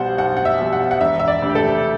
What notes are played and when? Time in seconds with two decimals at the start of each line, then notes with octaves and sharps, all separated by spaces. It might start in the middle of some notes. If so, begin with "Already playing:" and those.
Already playing: B1 B2 G3 C5 F#5
0.18 B1 F#5
0.37 F#5
0.45 E5
0.59 B2 G3
0.73 F#5
0.91 F#5
1.01 E1 E5
1.20 E5
1.28 D5
1.41 D2 C3
1.50 G4
1.55 A4